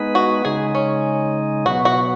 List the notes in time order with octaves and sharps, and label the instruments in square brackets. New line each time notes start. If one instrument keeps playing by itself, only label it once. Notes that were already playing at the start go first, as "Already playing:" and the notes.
Already playing: [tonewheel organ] G#3 B3 D#4 B4
[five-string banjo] F#4
[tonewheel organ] C#3 G#3 D#4 [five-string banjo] G#4
[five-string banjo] C#4
[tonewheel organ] B2 F#3 B3 [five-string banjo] F#4
[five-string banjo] F#4